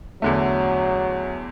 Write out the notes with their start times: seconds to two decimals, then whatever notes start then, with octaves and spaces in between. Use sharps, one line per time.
0.22 E2 D3 F#3 A3